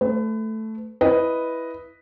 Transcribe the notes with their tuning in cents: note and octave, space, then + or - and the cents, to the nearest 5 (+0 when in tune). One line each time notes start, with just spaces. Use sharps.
A3 +0 B4 +30
E4 +0 B4 +0 D#5 +0